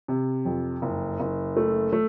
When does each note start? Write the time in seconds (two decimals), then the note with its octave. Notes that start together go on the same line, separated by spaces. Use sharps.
0.08 C3
0.45 F2
0.82 F#1
1.20 F#1
1.56 A3
1.92 A3